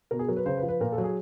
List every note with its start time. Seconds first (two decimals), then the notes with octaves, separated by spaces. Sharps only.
0.11 B2 A#4
0.19 G#4
0.28 F#3 A#4
0.36 B4
0.46 C#3 C5
0.57 B4
0.63 F3
0.69 B4
0.80 A#2 A#4
0.92 A4
0.98 F#3
1.04 G#4